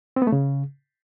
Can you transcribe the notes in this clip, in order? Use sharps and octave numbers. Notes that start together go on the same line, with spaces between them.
C4
B3
A3
C#3